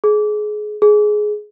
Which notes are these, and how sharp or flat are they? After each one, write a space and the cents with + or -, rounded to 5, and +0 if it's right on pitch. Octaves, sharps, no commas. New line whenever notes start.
G#4 +25
G#4 +15